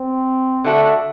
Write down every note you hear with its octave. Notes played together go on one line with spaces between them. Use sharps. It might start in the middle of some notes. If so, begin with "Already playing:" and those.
Already playing: C4
D3 A3 D4 F#4